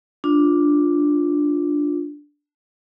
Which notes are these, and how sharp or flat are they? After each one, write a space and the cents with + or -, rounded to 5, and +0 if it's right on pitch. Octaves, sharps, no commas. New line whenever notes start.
D4 +0 F4 +0